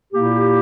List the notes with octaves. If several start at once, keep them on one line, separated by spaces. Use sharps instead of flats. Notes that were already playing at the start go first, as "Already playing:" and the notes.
A#2 A#3 E4 G4